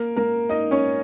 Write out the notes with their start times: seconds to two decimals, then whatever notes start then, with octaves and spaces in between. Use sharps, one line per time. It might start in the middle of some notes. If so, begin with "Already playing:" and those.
Already playing: A#3 A#4
0.17 A#3 A#4
0.49 D#4 D#5
0.71 C#4 C#5